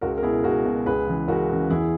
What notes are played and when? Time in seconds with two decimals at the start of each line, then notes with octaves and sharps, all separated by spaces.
0.01 C#2 F#4 A#4
0.18 A#4
0.23 B2 E4 G#4
0.44 C#2 F#4 A#4
0.65 B2
0.86 C#2 G#4 B4
1.07 C#3 E3
1.28 C#2 F#4 A#4
1.49 C#3 E3
1.69 E2 E4 G#4